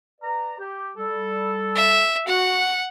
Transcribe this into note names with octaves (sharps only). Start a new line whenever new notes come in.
B4 D5 A#5
G4
G3 A4
E5
F#4 F#5